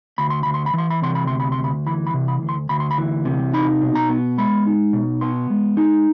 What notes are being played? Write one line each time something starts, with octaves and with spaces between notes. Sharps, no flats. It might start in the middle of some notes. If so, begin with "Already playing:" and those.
D2 B5
C6
D2 B5
C6
B5
E3 C6
B5
C3 C6
B5
D2 C6
B5
C6
D2
B5
E3 B5
B5
C3
B5
D2
C6
D2 B5
C6
B5
E3
C3
D#4 B5
B2
A#5
B3
G#3 B5
D#4
B2
B3 C6
G#3
D#4